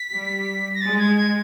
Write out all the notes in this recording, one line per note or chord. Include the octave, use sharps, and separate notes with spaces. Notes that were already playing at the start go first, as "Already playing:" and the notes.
Already playing: B6
G3
A#6
G#3 A6
G#6
G#6